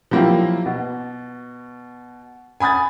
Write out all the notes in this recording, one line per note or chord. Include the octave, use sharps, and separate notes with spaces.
F3 F#3 A#3 C4 E4 G4
B2
G#5 B5 D#6 G#6 A6